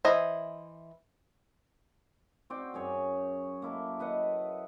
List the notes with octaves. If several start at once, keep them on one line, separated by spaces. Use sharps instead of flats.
E3 C5 D#5 G#5
C4 F#4 D5 G5
F#2 G#4 C#5
A#3 E4 A4
E4 B4 D#5 F#5